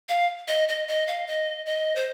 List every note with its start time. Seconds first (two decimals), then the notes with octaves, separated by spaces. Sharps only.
0.09 F5
0.48 D#5
0.68 D#5
0.88 D#5
1.07 F5
1.27 D#5
1.66 D#5
1.96 C5